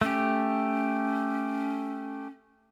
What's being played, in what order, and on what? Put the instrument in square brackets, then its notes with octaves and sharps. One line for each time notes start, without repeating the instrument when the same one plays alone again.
[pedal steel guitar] A3 G4 [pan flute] C#4